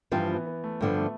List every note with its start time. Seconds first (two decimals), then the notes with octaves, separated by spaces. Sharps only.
0.12 G2 E3 F3 C4 F4
0.29 B3
0.46 B3
0.64 A3
0.81 G2 D3 F3 B3
0.98 A3